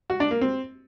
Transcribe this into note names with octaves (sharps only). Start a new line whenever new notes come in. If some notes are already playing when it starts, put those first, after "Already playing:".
F#4
D4
A#3
C4